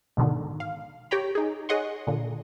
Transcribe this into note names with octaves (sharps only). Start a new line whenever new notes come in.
G#2 B2 D3 D#3
F5
G4 C#5 G5 A#5 B5
D#4 G#4
G#4 C#5 D#5 F#5 C6
A#2 D3